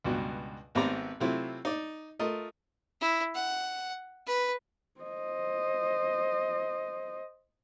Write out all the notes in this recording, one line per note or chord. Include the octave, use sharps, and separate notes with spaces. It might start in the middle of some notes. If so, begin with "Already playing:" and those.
C#2 G2 B2
G#1 B3 C4 G4 D5 A#5
C3 F#3 A3 C4 E4 F4
D#4 D5
A3 F4 A#4 D#5
E4
F#5
B4
C5 D#5